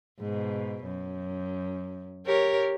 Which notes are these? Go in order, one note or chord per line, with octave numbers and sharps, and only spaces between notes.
G#2 B2
F#2
G4 A#4 C#5